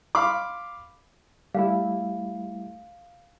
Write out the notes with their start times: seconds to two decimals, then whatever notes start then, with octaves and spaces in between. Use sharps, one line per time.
0.15 F5 B5 C6 D6
1.55 G3 A3 E4 F5